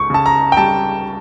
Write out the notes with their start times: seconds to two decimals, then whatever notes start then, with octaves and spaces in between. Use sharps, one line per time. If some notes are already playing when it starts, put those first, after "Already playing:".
Already playing: C#2 C#6
0.10 C#3 A5
0.26 A#5
0.52 G5
0.57 G3 A5